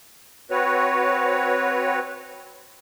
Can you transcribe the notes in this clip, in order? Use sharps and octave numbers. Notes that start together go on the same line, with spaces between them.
C4 F#4 B4 C#5